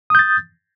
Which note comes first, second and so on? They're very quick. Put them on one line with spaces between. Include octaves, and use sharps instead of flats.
D#6 G6 A6